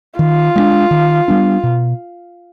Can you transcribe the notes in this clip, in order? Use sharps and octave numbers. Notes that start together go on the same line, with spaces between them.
D#3 F4
G#3 B3 D4
D#3
G3 B3 D4
B2